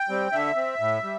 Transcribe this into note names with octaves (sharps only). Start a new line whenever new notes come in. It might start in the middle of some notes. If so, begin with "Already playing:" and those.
Already playing: G5
G3 C4
D3 E5
C4
A2
G3